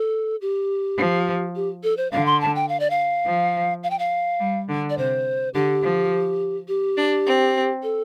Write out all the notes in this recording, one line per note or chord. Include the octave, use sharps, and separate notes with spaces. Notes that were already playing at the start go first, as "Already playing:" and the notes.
Already playing: A4
G4
F3
G4
A4
C5
D3 F5
C6
A5
G5
F5
D5
F5
F3
F5
G5
F5
G3
D3
D5
C3 C5
D3 G4
F3
G4
D4
C4
A4